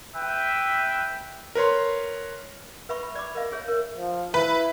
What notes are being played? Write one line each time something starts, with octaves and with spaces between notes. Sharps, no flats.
B4 E5 G5
A#4 B4 C#5 C6
B4 E5 B5 C#6
B5
D5 B5 D6
A#4 D#5 F5
G#4 C#5 E5
A#4 C#5
F3
E4 B4